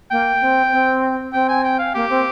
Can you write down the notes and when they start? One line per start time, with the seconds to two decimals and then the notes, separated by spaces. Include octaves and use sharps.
0.11 A#3 G5
0.41 C4
0.72 C4
1.33 C4 G5
1.49 G#5
1.64 G5
1.79 F5
1.95 A#3 G4
2.10 C4